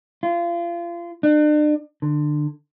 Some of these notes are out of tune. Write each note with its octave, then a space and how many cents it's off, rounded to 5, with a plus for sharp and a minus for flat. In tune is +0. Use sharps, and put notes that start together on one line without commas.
F4 -30
D4 +40
D3 +25